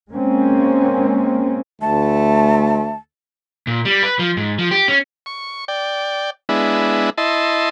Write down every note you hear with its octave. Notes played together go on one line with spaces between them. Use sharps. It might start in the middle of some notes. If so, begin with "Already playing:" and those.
G#3 A#3 C4 C#4
D2 A3 A5
A#2
G3
B4
F3
G#2
F3
G4
C#4
C#6
D5 G5
G#3 B3 D4 E4
E4 D#5 A5 C6